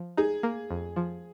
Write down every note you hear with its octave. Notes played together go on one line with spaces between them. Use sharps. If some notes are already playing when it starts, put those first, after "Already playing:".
Already playing: F3
D#4 G#4
A#3
F2
F3